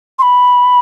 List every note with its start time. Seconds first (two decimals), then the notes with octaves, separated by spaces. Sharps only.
0.19 C6
0.22 B5